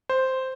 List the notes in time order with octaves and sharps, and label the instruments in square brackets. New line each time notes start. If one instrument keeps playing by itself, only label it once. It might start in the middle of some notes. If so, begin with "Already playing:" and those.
[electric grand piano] C5